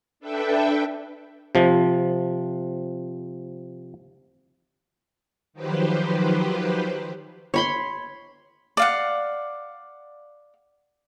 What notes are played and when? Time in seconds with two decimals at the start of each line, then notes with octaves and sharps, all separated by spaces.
0.20 D4 A4 B4 E5 G5
1.55 C3 F3
5.53 D#3 F3 F#3 G4 B4 C5
7.54 C#5 B5 C6
8.77 D5 F5 F#5